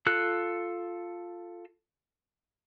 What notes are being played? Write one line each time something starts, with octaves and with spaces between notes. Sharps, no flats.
F4 A4 F#6